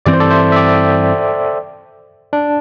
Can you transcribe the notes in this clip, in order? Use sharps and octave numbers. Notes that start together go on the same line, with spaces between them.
G2 E3 C4 D5
C5
A4 D5
C5 E5
E5
D5 G5
D4